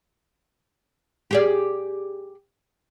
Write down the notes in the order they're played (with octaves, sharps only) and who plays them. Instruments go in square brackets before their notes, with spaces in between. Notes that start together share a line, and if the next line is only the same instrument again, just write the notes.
[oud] G4 G#4 D5